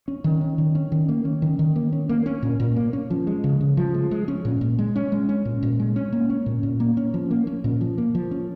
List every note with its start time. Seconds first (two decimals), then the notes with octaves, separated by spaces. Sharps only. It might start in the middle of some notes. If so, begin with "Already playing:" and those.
0.08 C#4
0.24 D#3
0.41 C#4
0.58 D#3
0.75 C#4
0.92 D#3
1.09 A#3
1.25 C#4
1.42 D#3
1.59 D#3
1.76 A#3
1.93 C#4
2.09 A#3
2.26 C#4
2.42 A#2
2.60 A#2
2.76 A#3
2.93 C#4
3.10 F3
3.27 G#3
3.44 C#3
3.61 C#3
3.77 F3
3.94 G#3
4.11 G#3
4.28 C#4
4.45 A#2
4.61 A#2
4.79 G#3
4.96 C#4
5.12 G#3
5.29 C#4
5.45 A#2
5.63 A#2
5.80 G#3
5.96 C#4
6.13 A#3
6.30 C#4
6.46 A#2
6.63 A#2
6.80 A#3
6.97 C#4
7.14 F3
7.31 A#3
7.47 C#4
7.64 A#2
7.81 F3
7.98 A#3
8.15 F3
8.31 C#4